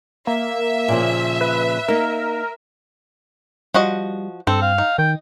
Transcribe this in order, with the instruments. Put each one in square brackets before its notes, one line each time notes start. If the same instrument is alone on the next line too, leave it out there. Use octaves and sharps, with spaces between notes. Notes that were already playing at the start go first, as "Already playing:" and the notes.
[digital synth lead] A#3 [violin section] E5
[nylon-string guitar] A#2 C#3 F3
[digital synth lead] B4
[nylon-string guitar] A#3 D#4 [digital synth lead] A#4
[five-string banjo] F3 F#4 D#5 [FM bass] G3
[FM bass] G2 [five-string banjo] C4 [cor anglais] A4
[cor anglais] F5
[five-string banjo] D#4
[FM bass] D#3 [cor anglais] G5